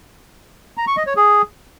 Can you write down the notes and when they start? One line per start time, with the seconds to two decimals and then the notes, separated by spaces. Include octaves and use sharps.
0.78 A#5
0.87 C#6
0.97 D#5
1.07 C#5
1.16 G#4